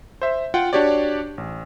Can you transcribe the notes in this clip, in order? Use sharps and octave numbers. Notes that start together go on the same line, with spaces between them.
C5 E5
F4 F#5 G5
D4 F#4 G4 C#5 D5
A1